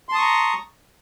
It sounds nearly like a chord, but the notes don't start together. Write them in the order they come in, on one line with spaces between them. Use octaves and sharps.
C6 A5 D#6 C#6 A#5